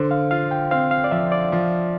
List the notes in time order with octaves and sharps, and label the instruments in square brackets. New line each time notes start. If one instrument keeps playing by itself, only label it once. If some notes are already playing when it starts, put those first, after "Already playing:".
Already playing: [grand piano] D3 [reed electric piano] C5
[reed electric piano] F5
[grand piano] F4 [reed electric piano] F5
[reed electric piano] G5
[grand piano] C4 [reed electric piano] F5
[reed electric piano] F5
D5
[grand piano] F3 [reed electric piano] E5
[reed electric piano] D5
[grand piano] F3